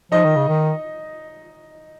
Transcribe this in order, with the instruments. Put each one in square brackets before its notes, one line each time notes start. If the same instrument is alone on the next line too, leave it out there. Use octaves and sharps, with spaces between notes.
[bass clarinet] F3 [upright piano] D#4 D#5
[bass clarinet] D#3
C#3
D#3